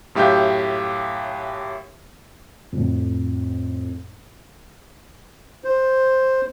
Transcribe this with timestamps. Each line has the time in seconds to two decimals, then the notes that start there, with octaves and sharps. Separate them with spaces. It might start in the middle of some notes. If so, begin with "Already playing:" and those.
0.15 F#2 A2 G4 E5 F5 G6
2.72 F2 A2
5.64 C5